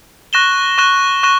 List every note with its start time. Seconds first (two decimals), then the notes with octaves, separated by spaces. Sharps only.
0.33 C#6 F#6 A#6 E7 G7
0.78 C#6 F#6 A#6 E7 G7
1.23 C#6 F#6 A#6 E7 G7